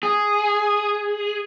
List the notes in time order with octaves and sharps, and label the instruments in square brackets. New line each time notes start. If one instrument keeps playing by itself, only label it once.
[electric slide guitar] G#4